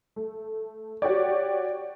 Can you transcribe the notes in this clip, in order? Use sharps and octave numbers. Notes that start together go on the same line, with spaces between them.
A3
F#4 G4 C#5 D5